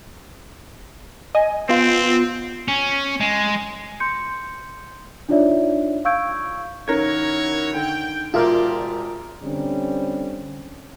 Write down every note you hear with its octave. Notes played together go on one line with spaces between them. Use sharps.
D#5 G#5
B3 C4 F4
C#4
G#3
C6 G6 C#7
D4 D#4 F4 C#5 D5 E5
F5 C#6 E6 G6 G#6 D7
D#3 C#4 E4 F#4 A#4 C#5 G#6
D3 G5
E1 F4 G4 A#4 C5 D5 E5
D3 G3 C4 C#4